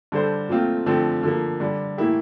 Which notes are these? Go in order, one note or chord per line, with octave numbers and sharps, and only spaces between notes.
D3 G3 D4 A4 C5
A#2 A3 C4 F4
D3 F3 A3 C4
D3 F3 A#3
D3 G3 D4
A2 E3 A#3 E4 G4